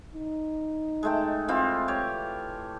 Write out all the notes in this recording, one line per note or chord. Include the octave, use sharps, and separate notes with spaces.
D#4
G#3 A3 G5
E3 C4 F4
G4 C#5